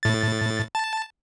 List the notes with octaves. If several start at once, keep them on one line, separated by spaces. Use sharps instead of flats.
A2 A6
A5